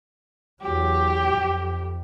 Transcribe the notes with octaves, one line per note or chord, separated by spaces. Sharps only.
E2 F#3 G4
F2